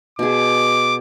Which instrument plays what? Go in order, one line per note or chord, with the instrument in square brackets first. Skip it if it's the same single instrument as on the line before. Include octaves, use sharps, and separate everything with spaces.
[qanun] B2 G#4 [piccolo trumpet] D6